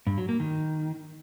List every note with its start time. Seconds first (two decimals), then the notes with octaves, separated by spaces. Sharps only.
0.07 G2
0.18 F#3
0.29 A#3
0.40 D#3